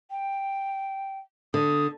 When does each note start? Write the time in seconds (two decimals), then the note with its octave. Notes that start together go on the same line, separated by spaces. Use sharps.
0.10 G5
1.54 D3 D#6